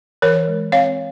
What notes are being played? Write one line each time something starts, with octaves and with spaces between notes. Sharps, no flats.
E3 A#4 C#5
G#3
C4 C#5 F5